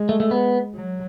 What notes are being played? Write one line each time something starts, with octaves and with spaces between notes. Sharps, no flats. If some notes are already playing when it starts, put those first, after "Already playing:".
Already playing: G#3
A3
A3
B3
F#3